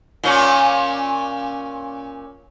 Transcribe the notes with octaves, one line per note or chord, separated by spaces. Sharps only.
A#2 C#4